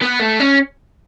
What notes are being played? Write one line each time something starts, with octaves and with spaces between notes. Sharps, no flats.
B3
A3
C#4